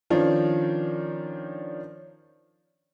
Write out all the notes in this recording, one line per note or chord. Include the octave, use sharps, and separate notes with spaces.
D#3 F3 C#4 D4